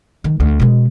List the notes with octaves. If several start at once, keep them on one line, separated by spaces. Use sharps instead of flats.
D#3
D2
B2 G#3